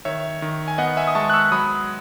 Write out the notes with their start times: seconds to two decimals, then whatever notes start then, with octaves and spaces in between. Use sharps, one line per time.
0.05 D#3 C#5 E5
0.42 D#3
0.68 G#5
0.78 B3 D#5 F#5
0.97 E5 G#5
1.07 D#6
1.15 G#3 A5 C#6
1.30 F#6
1.34 C#6 E6
1.52 F#3 B5 D#6